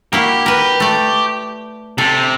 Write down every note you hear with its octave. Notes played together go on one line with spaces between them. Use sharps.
A#3 E4 F#4 G4
A#4 B4
A3 D5
C3 A4 D5